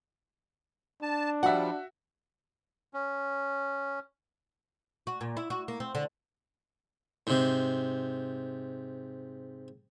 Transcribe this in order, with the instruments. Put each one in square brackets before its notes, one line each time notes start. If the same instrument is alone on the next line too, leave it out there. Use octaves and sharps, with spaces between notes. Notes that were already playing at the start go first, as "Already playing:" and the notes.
[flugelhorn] D4 [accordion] A5
[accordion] F3 G3 [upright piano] F#4 E5 [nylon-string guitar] F#5
[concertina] C#4
[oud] F#4
A#2
E4
F#4
A#3
C4
D3
[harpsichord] G#2 C3